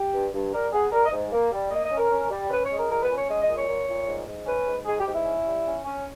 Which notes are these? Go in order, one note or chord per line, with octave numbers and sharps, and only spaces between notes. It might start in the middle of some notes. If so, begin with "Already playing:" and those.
Already playing: G4
G2
G2
G3 A#4
B3 G#4
G3 A#4
D#5
G#2
A#3
G3
A#3 D#5
D#5
C#4
A#4
C#4
G3
C#4 B4
C#5
G#3
A#4
A#2 A#4
B4
C#4
C#5
G#3 D#5
D#5
A#2
C#5
A#2
A#2
G#2
G#2
C#4 B4
G#2
G#2 G#4
G4
G#2
E4
C#4
G3
C#4
C#4